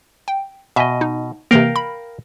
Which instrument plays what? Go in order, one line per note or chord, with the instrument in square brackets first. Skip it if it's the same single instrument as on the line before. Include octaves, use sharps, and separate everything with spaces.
[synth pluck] G5
[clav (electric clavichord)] B2 D#5 [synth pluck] E5 G#5
[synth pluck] D#4
[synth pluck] C3 E3 A#3 [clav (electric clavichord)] A#4 F5 G5
[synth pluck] B5